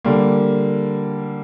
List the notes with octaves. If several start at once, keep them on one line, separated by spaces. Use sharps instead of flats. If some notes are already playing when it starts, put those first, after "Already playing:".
D3 G3 A#3